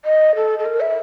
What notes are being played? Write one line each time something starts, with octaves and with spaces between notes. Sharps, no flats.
D#5
A4
A4
A#4
E5